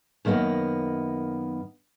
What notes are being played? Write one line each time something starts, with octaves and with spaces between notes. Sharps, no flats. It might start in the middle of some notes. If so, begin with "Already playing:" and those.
F#2 D#3 A#3 B3